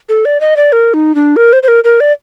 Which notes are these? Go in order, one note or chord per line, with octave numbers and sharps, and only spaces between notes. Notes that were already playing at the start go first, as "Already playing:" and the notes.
A4
D5
D#5
D5
A#4
D#4
D4
A#4
C5
C5
A#4
A#4
D5